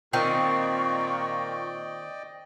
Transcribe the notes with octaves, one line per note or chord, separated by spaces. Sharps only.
A#2 D#3 C4 D5 D#5 G5 C#6